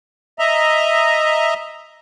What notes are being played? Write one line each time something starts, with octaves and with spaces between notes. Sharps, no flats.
D#5 E5 A#5